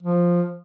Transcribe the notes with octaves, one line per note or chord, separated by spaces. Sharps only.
F3